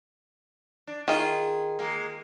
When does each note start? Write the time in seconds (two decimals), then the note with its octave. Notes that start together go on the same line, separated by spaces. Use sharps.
0.87 D4
1.08 D#3 F4 G#4
1.79 G#3 A#3